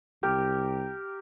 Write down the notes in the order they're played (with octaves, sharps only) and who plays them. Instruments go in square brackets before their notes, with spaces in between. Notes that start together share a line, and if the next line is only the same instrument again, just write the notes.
[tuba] C2 [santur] G4 A#4